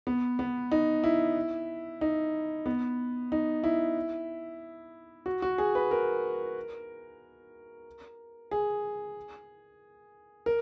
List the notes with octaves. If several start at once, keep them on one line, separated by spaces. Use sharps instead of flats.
B3
B3
D#4
E4
D#4
B3
D#4
E4
F#4
F#4
G#4
B4
A#4
G#4
A#4